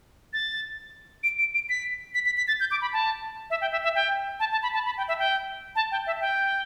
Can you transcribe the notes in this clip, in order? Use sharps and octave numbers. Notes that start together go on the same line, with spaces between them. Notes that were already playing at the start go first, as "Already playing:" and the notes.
A6
D7
D7
D7
B6
B6
B6
B6
A6
G6
D6
B5
A5
E5
G5
E5
E5
G5
A5
A5
B5
A5
B5
G5
E5
G5
A5
G5
E5
G5